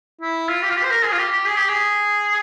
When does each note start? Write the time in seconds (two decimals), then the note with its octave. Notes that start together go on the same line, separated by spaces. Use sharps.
0.21 E4
0.49 F4
0.62 G4
0.70 F4
0.76 G4
0.83 C5
0.90 A#4
1.05 G#4
1.12 F4
1.18 G4
1.31 G4
1.46 G#4
1.56 G4
1.69 G#4